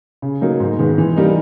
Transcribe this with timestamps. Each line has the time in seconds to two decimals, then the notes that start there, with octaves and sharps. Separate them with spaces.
0.22 C#3
0.41 F#3 A#3 D#4
0.60 G#2
0.79 D#3 G#3 B3
0.98 E3
1.16 G3 A#3 D#4